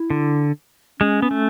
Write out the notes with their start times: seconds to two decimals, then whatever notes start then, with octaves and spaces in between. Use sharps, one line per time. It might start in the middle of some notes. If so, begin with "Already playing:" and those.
Already playing: E4
0.10 D3
1.00 G#3 C#4
1.22 B3
1.31 A3